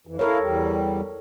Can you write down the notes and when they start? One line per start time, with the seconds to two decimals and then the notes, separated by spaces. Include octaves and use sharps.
0.07 F2 E3
0.19 E4 A4 A#4 C#5 F5
0.39 E2 G3